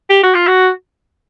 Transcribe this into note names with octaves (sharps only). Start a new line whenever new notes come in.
G4
F#4
F4
F#4